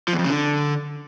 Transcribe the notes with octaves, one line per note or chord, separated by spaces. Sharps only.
F3
E2
F2
C#3
D3